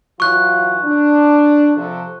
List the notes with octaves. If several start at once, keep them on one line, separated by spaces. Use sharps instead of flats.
E3 F#3 F4 C#6 F#6
D4
C3 F3 A4